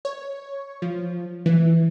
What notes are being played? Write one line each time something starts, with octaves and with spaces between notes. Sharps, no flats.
C#5
F3
E3